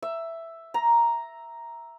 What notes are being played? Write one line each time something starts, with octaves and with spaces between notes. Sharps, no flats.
E5
A#5